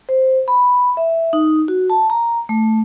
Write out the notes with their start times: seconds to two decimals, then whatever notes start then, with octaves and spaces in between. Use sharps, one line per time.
0.09 C5
0.48 B5
0.97 E5
1.33 D#4
1.68 F#4
1.90 A5
2.10 A#5
2.49 A3